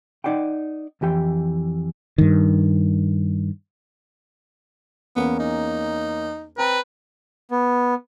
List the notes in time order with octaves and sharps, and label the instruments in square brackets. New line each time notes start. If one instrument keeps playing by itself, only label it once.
[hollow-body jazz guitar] D#4 D5 F#5 G5
F2 E3 G4 G5
[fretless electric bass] G2 D#3
[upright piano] E2 A#3 C#4 [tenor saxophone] B3
[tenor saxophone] D#4
[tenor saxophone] C4 [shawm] B4 [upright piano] A#5
[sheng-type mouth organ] B3